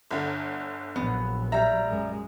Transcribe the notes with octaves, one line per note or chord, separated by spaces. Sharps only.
G1 D3
A#1 F#3 B3
G3 E5 A#5
F#2 G#3